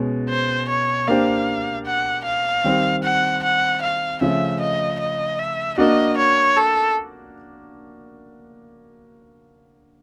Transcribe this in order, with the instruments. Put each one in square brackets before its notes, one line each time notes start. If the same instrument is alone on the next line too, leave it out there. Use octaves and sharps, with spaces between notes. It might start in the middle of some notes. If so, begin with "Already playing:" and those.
Already playing: [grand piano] B2 G#3 C#4
[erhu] C5
C#5
[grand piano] A#3 D4 G4 C5 [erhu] F5
[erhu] F#5
F5
[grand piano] D#3 G3 C4
[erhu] F#5
F#5
F5
[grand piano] C#3 F3 A3 [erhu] E5
[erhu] D#5
D#5
E5
[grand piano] A#3 D4 F#4 [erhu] D#5
[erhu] C#5
A4